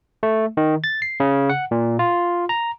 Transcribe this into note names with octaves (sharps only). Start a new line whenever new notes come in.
A3
D#3
A6
C7
C#3
F#5
A#2
F4
A#5